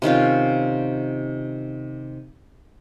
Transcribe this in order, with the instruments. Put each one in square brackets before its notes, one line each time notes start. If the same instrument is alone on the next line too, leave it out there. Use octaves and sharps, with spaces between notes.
[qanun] C3 D#3 C#4 F4